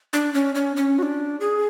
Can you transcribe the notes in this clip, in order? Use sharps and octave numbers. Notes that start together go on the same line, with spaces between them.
D4
C#4
C#4
C#4
F#4
D4
G#4